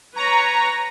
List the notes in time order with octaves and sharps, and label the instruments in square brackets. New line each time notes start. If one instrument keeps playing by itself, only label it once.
[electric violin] B4 C#5 [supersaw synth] A#5